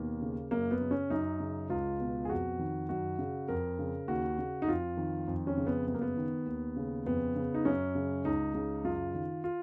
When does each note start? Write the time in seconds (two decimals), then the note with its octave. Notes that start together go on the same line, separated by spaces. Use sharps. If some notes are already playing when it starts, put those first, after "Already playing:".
Already playing: D#2 B2 A#3
0.22 C#3
0.51 F#2 A#3
0.71 B3
0.81 C#3
0.91 C#4
1.10 F#2 D#4
1.40 C#3
1.70 C#2 F4
2.00 B2
2.25 G#4
2.29 F2 F#4
2.59 D#3
2.89 F#2 F#4
3.19 C#3
3.48 F2 A#4
3.79 C#3
4.08 D#2 F#4
4.38 C#3
4.62 D#4
4.67 F2 F4
4.97 D#3
5.28 F2
5.47 C#4
5.57 C#3
5.67 B3
5.87 F#2 B3
5.94 A#3
6.02 B3
6.17 D#3
6.46 D#2
6.76 C#3
7.06 F2 B3
7.36 C#3
7.54 D#4
7.65 F#2 C#4
7.95 C#3
8.25 C#2 D#4
8.55 C#3
8.84 F#2 F4
9.15 D#3
9.44 F4